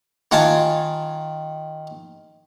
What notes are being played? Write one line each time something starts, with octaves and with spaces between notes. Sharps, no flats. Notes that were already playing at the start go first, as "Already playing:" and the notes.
D#3 F4 F#5 G#5 A5